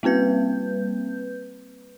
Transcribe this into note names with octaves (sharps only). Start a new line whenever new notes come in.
G3 A#3 C4 B4 G6